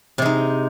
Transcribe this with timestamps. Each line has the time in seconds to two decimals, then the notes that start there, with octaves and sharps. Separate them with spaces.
0.18 C3
0.22 G#3
0.25 D#4